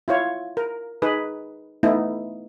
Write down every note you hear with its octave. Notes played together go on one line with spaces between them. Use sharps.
E4 F4 C#5
A#4
D#4 G#4 B4
A3 B3 D#4 E4